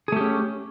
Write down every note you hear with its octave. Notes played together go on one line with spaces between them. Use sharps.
A3 C#4 G4 G#4